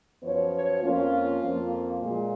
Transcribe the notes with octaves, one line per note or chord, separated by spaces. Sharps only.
F#2 F3 B3 C#5
C#5
F2 F3 A#3 C#4 F4
F2 F3 A#3
A#2 G#3 F4